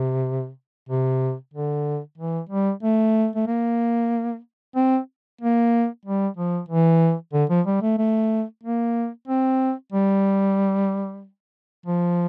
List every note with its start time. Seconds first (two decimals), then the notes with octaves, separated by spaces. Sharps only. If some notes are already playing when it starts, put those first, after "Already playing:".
Already playing: C3
0.89 C3
1.54 D3
2.18 E3
2.49 G3
2.83 A3
3.36 A3
3.47 A#3
4.76 C4
5.41 A#3
6.05 G3
6.37 F3
6.69 E3
7.33 D3
7.50 F3
7.67 G3
7.82 A3
7.98 A3
8.64 A#3
9.28 C4
9.92 G3
11.86 F3